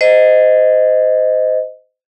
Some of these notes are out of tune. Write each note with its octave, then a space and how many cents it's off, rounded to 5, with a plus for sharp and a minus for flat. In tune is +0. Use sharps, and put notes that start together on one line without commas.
C5 -25 D#5 +0